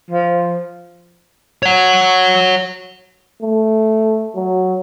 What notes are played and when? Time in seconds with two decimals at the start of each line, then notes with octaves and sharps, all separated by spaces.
0.10 F3
1.63 C#5 F#5
3.43 A3
4.36 F#3